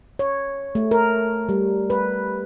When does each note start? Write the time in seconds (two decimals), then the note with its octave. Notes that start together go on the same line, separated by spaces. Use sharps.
0.19 C#5
0.75 A3
0.91 A#4
1.49 G3
1.90 B4